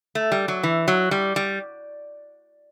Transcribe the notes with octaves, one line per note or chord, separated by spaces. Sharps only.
A3
G3
F#3
E3
F#3
G3
G3